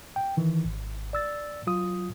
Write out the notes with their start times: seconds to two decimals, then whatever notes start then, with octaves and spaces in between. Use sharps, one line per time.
0.16 G5
0.37 D#3 E3
0.65 G#1
1.13 D5 E6 A6
1.67 F#3 F4 D#6